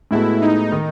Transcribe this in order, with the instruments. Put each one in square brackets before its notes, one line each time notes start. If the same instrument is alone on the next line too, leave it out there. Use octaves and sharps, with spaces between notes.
[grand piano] A2 G#3 B3 F#4 A4 [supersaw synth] E4
[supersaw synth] D#4
[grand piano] D#3